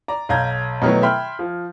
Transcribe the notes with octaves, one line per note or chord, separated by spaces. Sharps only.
D5 A#5
B1 F5 A#5 G6 G#6
B2 D#3 F#3 A3 B3 E4
E5 G5 B5 C6 F6
F3